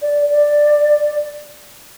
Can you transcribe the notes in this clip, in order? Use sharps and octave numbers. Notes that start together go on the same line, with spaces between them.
D5
D5